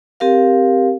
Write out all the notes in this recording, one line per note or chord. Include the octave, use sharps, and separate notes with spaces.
C4 G4 A#4 F5